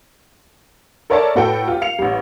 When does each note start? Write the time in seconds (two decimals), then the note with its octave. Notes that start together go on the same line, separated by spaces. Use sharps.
1.10 A4 A#4 C#5 D5 E5 A5
1.36 A2 F#4 A4 B4 G5
1.68 F4 G4
1.81 F5 C#7 F7
1.99 A1 G3